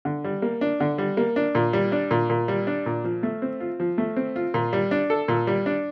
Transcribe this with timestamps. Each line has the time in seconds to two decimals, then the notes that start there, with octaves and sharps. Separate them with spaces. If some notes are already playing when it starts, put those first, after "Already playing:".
0.05 D3
0.24 G3
0.42 A#3
0.61 D4
0.80 D3
0.98 G3
1.17 A#3
1.36 D4
1.55 A#2
1.73 G3
1.92 D4
2.11 A#2
2.30 A#2
2.48 G3
2.67 D4
2.86 A#2
3.04 F3
3.23 A3
3.42 C4
3.60 F4
3.80 F3
3.98 A3
4.17 C4
4.36 F4
4.54 A#2
4.73 G3
4.91 D4
5.10 A4
5.28 A#2
5.47 G3
5.66 D4